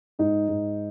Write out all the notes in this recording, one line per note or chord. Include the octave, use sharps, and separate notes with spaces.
G#2 D#4
G#2